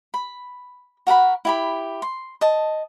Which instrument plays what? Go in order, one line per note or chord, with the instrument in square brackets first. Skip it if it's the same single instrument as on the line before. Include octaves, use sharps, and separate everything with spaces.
[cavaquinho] B5
F#4 A#4 F#5 B5
E4 G4 B5
C6
D#5 A5